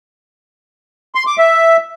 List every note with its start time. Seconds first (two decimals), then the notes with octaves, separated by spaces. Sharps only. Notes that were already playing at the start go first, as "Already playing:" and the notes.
1.15 C6
1.27 D6
1.38 E5